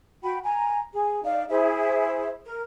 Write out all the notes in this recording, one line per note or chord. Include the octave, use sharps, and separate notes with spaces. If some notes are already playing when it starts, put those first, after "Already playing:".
F#4 G5 B5
G#5 A#5
G#4
D#4 D5 F5
E4 G#4 C5 E5
A#4